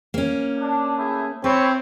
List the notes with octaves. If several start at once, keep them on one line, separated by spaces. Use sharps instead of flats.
A#3 C#4
D4
A3 E4 G#4
C4 E4 B4 C#5